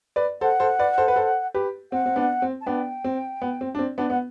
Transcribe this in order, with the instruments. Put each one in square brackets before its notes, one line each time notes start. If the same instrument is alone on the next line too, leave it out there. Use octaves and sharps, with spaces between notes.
[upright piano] B4 D5
[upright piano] A4 C5 [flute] F#5
[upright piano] A4 C5
B4 D5
A4 C5
B4
A4 C5
G4 B4
[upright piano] C4 [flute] F#5
[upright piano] C4
B3 D4
C4
[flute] A5
[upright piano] B3 D4 [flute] G5
[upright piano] C4
B3
C4
D4
C4
B3 D4
[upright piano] B3 [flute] F#5